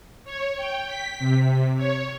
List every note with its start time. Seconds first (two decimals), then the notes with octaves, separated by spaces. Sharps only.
0.25 C#5
0.57 G5
0.87 B6
1.19 C3
1.77 C#5